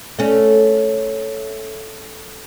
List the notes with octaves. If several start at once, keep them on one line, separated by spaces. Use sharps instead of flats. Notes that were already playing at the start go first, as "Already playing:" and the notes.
A3 C#4